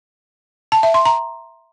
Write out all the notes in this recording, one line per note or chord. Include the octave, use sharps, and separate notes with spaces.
A5
E5
C6
A#5